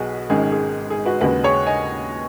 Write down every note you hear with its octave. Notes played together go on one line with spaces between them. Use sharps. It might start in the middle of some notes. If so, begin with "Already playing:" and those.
Already playing: B1 B2 F#4 G#4 B4
G#1 G#2 D#3 G#3 C#4 G#4
G#4
G#4
F#4 B4
D#2 C#3 G#3 F#4 B4
G#4 C#5
D#5 G#5